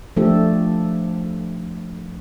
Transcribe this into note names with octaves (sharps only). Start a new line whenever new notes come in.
F3 A3 D4 G4 A4